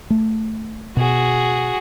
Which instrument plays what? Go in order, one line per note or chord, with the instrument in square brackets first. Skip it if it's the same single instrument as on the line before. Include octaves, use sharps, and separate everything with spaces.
[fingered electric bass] A3
[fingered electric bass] B2 [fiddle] F#4 G#4